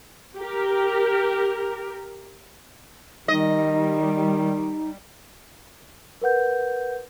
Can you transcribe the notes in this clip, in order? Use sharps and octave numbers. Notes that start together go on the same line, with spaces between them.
G4 A#4
D#3 G3 D#4 D#5
A#4 B4 F#5 G6